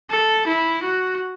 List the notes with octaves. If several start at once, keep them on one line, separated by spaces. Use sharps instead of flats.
A4
E4
F#4